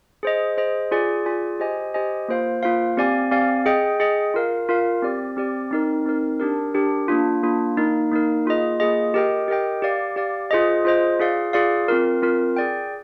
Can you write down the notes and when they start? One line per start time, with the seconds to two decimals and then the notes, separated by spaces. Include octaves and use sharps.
0.23 G#4 C5 D#5
0.57 G#4 C5 D#5
0.91 F4 G#4 D5 G#5
1.26 F4 G#4 D5 G#5
1.60 G4 C5 D#5 G#5
1.94 G4 C5 D#5 G#5
2.28 A#3 F4 C5 F5
2.63 A#3 F4 C5 F5
2.97 C4 G4 D5 F5 G#5
3.32 C4 G4 D5 F5 G#5
3.66 G#4 D#5 G5
4.00 G#4 D#5 G5
4.34 F4 A#4 F5
4.69 F4 A#4 F5
5.02 C4 G4 D5
5.37 C4 G4 D5
5.71 C4 D#4 A#4
6.06 C4 D#4 A#4
6.40 D4 G4 A#4
6.74 D4 G4 A#4
7.08 A#3 D4 F4
7.43 A#3 D4 F4
7.77 A#3 D#4 A#4
8.11 A#3 D#4 A#4
8.46 A#3 F4 G#4 D#5
8.80 A#3 F4 G#4 D#5
9.14 G4 A#4 D#5 G5
9.48 G4 A#4 D#5 G5
9.82 G4 D5 F5
10.16 G4 D5 F5
10.51 F4 G#4 C5 D#5
10.85 F4 G#4 C5 D#5
11.20 F4 G#4 D5 F5
11.53 F4 G#4 D5 F5
11.88 C4 F4 A#4
12.22 C4 F4 A#4
12.56 G#4 D5 G5